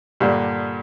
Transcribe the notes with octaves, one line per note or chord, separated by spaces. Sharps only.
G2 A#2 D3